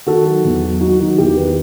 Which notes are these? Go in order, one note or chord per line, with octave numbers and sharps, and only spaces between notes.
D#3 F#4 A4
F#3
E2
F#3
F#3 D#4 F#4
D#3 D#4 F#4
E2 E4 G4
D#3 G4 B4